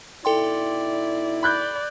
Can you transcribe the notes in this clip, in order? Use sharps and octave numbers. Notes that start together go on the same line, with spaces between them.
B2 D#4 E4 A4 D5 G5 C6
D5 B5 F#6 G6